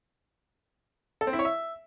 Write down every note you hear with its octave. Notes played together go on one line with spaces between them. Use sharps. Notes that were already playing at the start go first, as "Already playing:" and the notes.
A4
C4
E4
C#5
E5